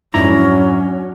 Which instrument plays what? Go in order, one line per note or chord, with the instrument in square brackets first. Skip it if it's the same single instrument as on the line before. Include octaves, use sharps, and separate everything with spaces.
[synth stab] F2 G#2 E4 [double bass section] F#3 [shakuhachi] C#4 [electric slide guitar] D4 A#5